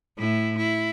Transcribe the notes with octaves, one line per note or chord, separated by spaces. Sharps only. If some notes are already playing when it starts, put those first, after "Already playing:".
A2 E4
E4